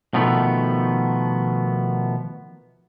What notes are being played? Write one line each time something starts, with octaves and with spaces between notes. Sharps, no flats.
B2 D#3 F3 A3 B3